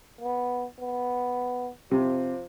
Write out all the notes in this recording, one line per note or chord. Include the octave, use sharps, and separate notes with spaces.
B3
B3
C3 F3